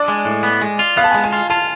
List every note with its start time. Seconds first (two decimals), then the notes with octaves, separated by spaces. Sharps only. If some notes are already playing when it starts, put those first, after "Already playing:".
Already playing: D4 D5
0.08 G#3
0.25 A2
0.43 B3
0.62 G#3
0.79 F4
0.97 B3 F5
1.04 A5
1.11 G#3 G#5
1.24 G#5
1.33 F4
1.50 F4 A5